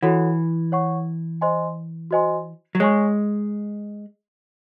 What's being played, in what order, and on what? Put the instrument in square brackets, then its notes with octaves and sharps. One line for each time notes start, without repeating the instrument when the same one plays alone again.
[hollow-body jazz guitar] E3 [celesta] F#4 A4 C#5 F#5
[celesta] C#5 F#5 C#6
C5 D#5 G#5 C6
F#4 C5 D#5 G#5 C6
[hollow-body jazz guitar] F#3
[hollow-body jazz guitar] G#3 [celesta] C#5 G#5 C#6